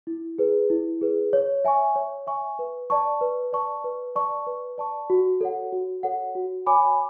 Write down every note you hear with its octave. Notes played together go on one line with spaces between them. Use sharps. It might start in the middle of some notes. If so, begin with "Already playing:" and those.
E4
G#4 B4
E4
G#4 B4
C#5
E5 G#5 C#6
C#5
E5 G#5 C#6
B4
D5 A5 C#6
B4
D5 A5 C#6
B4
D5 A5 C#6
B4
D5 A5 C#6
F#4
A4 C#5 F#5
F#4
A4 C#5 F#5
F#4
C#5 G#5 B5 D6